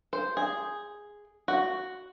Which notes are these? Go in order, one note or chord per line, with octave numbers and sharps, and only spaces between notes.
C5
G#4
F#4